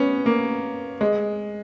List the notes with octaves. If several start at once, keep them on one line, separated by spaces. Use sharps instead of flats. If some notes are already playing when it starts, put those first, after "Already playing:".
Already playing: B3 C#4
A#3
G#3